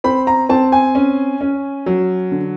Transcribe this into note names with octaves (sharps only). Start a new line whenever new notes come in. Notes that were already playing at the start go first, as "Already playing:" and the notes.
C4 B5
A#5
C4 A5
G#5
C#4
C#4
F#3
D3